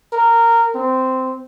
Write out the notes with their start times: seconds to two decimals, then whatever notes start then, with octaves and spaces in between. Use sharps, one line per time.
0.13 A#4
0.75 C4